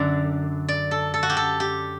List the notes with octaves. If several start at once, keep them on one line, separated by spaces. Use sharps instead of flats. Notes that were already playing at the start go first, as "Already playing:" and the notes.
Already playing: F#2 D3 D5
D5
A4
A4
F#4
G4
A4
G4